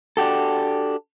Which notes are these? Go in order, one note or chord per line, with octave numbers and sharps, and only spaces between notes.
D4 F#4 G4 A4